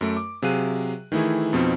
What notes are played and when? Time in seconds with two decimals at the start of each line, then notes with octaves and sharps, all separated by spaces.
0.01 F#2 A3 D7
0.17 D6
0.42 C3 F#3 G#4 F5 F#6 D#7
1.12 D#3 E3 A3 E4 G#4
1.53 F2 B2 F3 C4 D#4